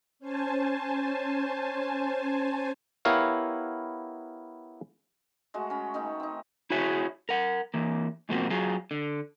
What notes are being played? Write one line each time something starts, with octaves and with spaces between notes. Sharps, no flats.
C#4 C5 G#5 A5
B3 E4 G4 A#4 C#5 F5
G#3 A3 F#4
C#4 B5
D#3 A3 C#4 D#4
C4 D#4
E4 F#4 G#4 C#5 E5
A#4 F#5
E3 A#3
G#2 B2 F3 A#3 C4 F#4
F#3 F4 G#4
D3